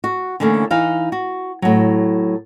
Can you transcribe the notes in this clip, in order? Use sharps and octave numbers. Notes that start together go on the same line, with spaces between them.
F#4
D3 E3 A3 A#3 C#4
E3 D#4 F5
F#4
A2 F#3